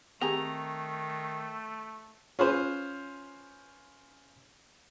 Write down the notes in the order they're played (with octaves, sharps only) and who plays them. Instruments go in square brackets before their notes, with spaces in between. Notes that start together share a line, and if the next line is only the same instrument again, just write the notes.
[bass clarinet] D#3 [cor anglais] A3 [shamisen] C4 G4 G#4 [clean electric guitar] A#5
[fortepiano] C#4 F4 G#4 B4 C5